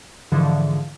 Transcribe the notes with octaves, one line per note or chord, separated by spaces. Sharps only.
G#2 D3 E3 F3